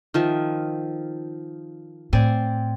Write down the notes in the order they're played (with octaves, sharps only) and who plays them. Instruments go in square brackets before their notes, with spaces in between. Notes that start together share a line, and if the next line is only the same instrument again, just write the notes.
[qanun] D#3 F3 E5
[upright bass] A2 [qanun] C4 D5 G#5